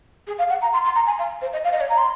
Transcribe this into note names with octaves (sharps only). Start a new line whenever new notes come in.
G#4
F5
F#5
A#5
C6
C6
A#5
G#5
F5
C5
D#5
F5
D#5
C#5
A#5
C6